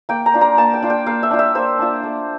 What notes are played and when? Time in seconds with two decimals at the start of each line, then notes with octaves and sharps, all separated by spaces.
0.09 A#3 G5
0.26 A#5
0.34 D4 F4
0.41 A#5
0.58 A#3 A5
0.74 G5
0.82 D4 F4
0.90 G5
1.06 A#3 F5
1.23 E5
1.31 D4 F4
1.39 E5
1.55 A#3 C5
1.79 D4 F4
2.03 A3